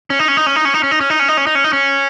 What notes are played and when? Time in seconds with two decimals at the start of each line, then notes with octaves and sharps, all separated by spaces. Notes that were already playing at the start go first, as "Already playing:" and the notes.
0.10 C#4
0.19 D#4
0.28 C#4
0.37 D#4
0.47 C#4
0.56 D#4
0.65 C#4
0.74 D#4
0.83 C#4
0.91 D#4
1.01 C#4
1.10 D#4
1.19 C#4
1.28 D#4
1.37 C#4
1.47 D#4
1.55 C#4
1.64 D#4
1.73 C#4